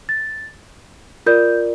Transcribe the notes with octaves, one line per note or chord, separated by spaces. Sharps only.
A6
F4 A#4 D5 G6